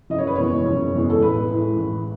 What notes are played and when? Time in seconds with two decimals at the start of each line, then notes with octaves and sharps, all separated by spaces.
0.10 F#1 D#5
0.18 C#5
0.27 B4
0.36 E2 B2 G#3 C#5
0.66 F#1
0.94 E2 B2 G#3
1.10 A4
1.22 A1 B4
1.50 A2 E3 G#3
1.77 A1